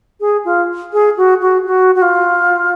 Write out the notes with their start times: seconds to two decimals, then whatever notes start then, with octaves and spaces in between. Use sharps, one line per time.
0.20 G#4
0.45 F4
0.93 G#4
1.17 F#4
1.41 F#4
1.66 F#4
1.95 F#4
2.02 F4